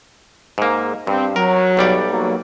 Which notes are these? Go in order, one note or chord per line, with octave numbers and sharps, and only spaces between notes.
G#2 A#3
G2 C4
F#3 A#4
B1 G3 D5
F#3 A#3